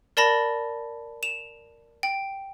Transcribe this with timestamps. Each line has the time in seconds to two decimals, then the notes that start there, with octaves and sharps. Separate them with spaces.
0.17 A#4 D5 A5 B5 A#6
1.23 E7 F7
2.03 G5